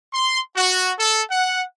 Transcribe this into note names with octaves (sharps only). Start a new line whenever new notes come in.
C6
F#4
A4
F#5